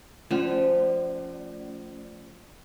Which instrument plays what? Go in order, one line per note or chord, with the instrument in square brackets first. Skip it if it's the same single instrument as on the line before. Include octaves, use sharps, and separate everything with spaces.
[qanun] F3 [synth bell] A3 C#4 D5